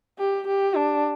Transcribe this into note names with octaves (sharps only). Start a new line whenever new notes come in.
G4
G4
D4